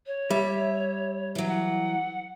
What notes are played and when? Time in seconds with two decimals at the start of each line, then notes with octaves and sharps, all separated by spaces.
0.06 C#5
0.30 G3 E5
1.35 E3 F#3
1.47 F#5